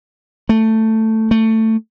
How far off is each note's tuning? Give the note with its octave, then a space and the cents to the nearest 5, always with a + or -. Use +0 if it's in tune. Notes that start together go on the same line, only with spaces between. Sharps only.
A3 +10
A3 +15